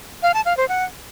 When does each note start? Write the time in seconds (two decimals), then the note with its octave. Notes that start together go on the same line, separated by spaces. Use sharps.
0.23 F5
0.34 A5
0.46 F5
0.57 C5
0.69 F#5